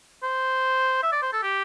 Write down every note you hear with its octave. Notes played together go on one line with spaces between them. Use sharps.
C5
E5
D5
C5
A4
G4